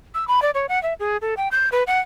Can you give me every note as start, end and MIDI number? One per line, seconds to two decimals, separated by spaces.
0.14 0.27 88
0.28 0.42 83
0.42 0.51 74
0.55 0.66 73
0.69 0.81 78
0.83 0.94 76
1.00 1.17 68
1.22 1.34 69
1.37 1.48 79
1.52 1.69 91
1.72 1.83 71
1.87 1.99 78